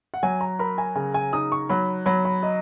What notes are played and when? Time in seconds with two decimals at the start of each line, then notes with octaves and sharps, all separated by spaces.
0.14 F#5
0.23 F#3 G#5
0.41 A#5
0.59 A#4 B5
0.78 G#5
0.95 C#3 G#5
1.14 G#5
1.33 D#4 D#6
1.52 C#6
1.69 F#3 B5
2.06 F#3 B5
2.25 B5
2.43 D#5